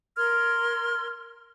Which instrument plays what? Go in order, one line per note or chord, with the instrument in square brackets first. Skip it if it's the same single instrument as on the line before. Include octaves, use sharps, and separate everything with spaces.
[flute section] A#4 C6 F6 G#6